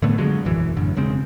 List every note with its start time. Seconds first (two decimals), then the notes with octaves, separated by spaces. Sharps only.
0.02 A2 D3 A3 B3
0.18 D3 F3 F#3 G#3
0.45 E1 A#1 F#2 E3
0.76 A1 F#2 D3
0.96 E1 C#3 G#3 C4